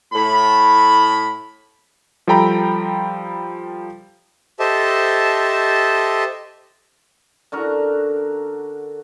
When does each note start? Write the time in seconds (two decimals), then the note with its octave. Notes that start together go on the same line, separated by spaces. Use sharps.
0.13 A2 B5
2.27 F3 G3 A4 G5 A#5 B5
4.59 G4 A4 C5 D#5 E5 A5
7.52 D3 F#4 A#4